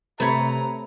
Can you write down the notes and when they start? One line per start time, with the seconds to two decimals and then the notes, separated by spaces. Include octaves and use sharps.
0.20 C3 A3 C4 B4 C#5 A#5